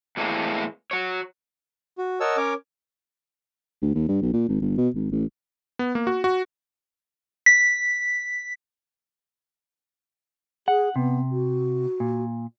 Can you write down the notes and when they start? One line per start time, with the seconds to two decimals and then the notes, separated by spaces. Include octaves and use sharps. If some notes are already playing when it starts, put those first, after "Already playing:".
0.17 E2 A2 E3 G#3 A#3 C4
0.91 F#4 C#5
1.98 F#4
2.20 A#4 C#5 D#5 F#5 A5 E6
2.37 C#4 A#4 C#5 D6
3.82 D2
3.94 D#2
4.08 G2
4.22 B1
4.33 A#2
4.48 G#1
4.61 G1
4.78 B2
4.95 G#1
5.11 A1
5.79 B3
5.95 A#3
6.07 F#4
6.24 F#4
7.46 B6
10.68 G#4 F#5
10.96 C3 B3
11.31 F#4
12.00 A#2